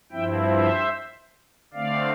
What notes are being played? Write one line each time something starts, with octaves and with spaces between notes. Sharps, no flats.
G2 F3 C4 E4 E5 G5
C5 E5
D3 A3 C4 D5 F5